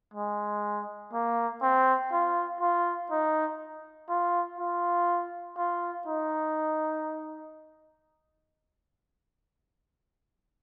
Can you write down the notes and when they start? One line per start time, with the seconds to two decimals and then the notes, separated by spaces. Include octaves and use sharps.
0.14 G#3
1.13 A#3
1.62 C4
2.12 F4
2.61 F4
3.11 D#4
4.09 F4
4.59 F4
5.57 F4
6.07 D#4